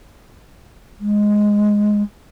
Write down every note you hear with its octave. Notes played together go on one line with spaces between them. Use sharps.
G#3